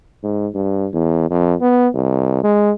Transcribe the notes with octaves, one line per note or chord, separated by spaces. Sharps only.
G#2
G2
E2
F2
B3
C2
G#3